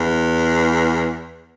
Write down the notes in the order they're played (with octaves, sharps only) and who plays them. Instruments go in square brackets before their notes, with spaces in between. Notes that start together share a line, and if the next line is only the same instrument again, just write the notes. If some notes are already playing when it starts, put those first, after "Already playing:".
Already playing: [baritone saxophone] E2